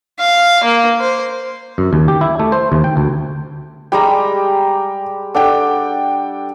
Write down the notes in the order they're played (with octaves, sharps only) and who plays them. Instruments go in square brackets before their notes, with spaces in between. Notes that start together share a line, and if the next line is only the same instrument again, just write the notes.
[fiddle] F5
A#3
C5
[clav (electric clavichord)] F#2
D#2
G4
E4
A3
C5
D#2
G5
D2
[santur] G3 G#3 G4 [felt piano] G5 A#5
[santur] D4 [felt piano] A4 F#5 G5